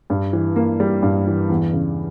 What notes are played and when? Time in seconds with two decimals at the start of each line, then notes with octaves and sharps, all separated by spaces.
0.10 G2
0.33 E3
0.56 A#3
0.80 G3
1.02 G2
1.27 E3
1.49 E2
1.73 C#3